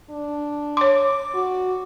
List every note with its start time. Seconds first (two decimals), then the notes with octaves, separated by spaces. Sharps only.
0.10 D4
0.77 C#5 C6 D6
1.35 F#4